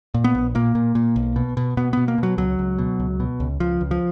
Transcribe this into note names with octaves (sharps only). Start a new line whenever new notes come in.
A#2
B3
A#1
A#2 A#3
A#2
A#2
B1
B2
B2
B2 B3
B2 B3
A#3
B2 F#3
C#2 F#3
C#2
B2
C#2
B2
C#2
C#2 F3
C#2
F3